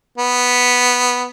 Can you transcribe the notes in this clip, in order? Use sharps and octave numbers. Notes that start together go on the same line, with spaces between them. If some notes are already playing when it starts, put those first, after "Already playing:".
B3